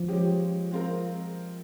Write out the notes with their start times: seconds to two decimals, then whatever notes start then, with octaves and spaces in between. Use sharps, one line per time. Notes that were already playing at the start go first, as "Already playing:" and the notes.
Already playing: F3
0.08 G#3 C#4 G4
0.71 G#3 C4 F4 A#4